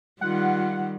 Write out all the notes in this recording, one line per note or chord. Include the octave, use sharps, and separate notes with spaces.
D#3 G3 F4 F#5